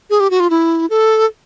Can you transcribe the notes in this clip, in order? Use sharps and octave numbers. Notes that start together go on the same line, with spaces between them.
G#4
G4
F#4
F4
E4
A4